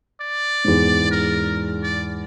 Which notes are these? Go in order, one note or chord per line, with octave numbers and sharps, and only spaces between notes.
D5
E2 G#2
A#4
D5